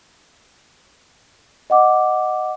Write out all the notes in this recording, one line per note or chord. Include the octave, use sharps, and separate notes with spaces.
D#5 F#5 D6